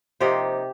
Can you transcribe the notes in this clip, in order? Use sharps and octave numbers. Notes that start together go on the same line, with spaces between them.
C3 F3 A#3 D#4 G4 C5